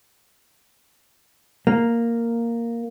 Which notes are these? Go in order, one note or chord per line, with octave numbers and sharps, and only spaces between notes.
A#3